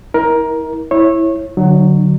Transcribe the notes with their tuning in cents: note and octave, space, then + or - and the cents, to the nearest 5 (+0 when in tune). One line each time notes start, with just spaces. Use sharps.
E4 -40 A#4 +15
E4 +0 C#5 -25
D3 +0 F#3 +0 D4 +40